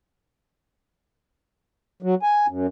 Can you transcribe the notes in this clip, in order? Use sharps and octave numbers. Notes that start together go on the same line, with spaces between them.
F#3
G#5
F#2